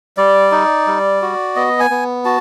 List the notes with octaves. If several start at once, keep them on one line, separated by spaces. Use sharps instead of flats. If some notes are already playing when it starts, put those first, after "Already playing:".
G3 D5
D#4
G3
F#4
B3 D#5
G#5
B3
F#4 A5